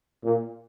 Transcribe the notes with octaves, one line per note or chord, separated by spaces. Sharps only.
A#2